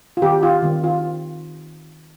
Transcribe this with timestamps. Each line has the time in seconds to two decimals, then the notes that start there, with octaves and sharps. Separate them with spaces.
0.17 F4
0.22 D#3 G3 C4 G4
0.43 F4
0.62 D#3 G3 C4
0.84 F4